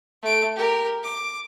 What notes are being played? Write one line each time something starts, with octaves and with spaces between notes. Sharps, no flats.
A3 D7
G4 A#4
D6